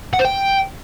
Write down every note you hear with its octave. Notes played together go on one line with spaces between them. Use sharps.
F#5
C5
G5